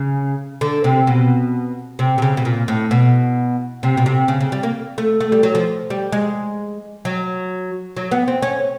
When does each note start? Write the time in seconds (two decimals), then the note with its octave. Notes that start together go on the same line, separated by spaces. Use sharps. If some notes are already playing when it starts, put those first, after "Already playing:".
Already playing: C#3
0.61 D3
0.84 C3
1.07 B2
1.99 C3
2.18 C3
2.22 C#3
2.37 B2
2.45 A#2
2.68 A2
2.91 B2
3.83 C3
3.97 B2
4.06 C3
4.28 C#3
4.41 C#3
4.52 G3
4.63 A#3
4.98 A3
5.21 A3
5.32 G3
5.43 F#3
5.55 F3
5.90 G3
6.12 G#3
7.05 F#3
7.97 F#3
8.11 B3
8.28 C4
8.42 C#4